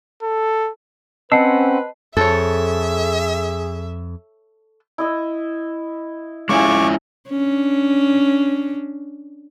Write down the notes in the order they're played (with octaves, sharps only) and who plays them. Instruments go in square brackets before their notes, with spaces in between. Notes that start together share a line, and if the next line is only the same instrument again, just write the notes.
[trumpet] A4
[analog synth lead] C4 [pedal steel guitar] C#4 F#5 E6 [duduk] B4 [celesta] D#5 A5 C7
[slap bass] F2 [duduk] G#4 [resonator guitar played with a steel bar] A4 C#5 [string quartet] E5
[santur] E4 D#5 E5
[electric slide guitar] G#3 C#4 E4 [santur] F4 G#4 [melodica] C#6 D6
[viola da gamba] C#4 D4